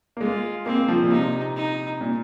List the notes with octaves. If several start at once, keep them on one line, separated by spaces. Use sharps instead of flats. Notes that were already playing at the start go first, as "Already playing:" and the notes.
A#3
G#3 F4
A#3 C4
F3
A#2
C3 D#4
D#4
A#2